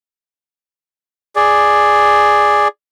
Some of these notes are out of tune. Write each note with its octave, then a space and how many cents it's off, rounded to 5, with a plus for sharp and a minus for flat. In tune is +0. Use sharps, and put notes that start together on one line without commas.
G#4 +0 D5 +0